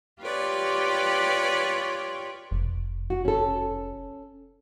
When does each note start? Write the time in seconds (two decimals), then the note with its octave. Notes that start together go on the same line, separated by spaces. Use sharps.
0.22 F4 G4 B4 C#5 D5
2.51 F1
3.10 F#4
3.25 C#4 A4